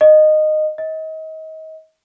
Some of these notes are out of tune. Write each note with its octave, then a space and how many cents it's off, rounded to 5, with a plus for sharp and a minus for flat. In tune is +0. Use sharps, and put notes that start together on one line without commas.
D#5 -15
D#5 +30